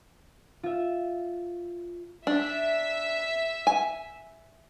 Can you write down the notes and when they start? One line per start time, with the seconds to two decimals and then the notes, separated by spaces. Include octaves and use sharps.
0.63 F4 E5
2.27 D4 E5
3.67 G#5